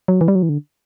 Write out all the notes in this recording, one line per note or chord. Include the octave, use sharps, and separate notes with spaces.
F#3
E3
G3
F#3
E3
D3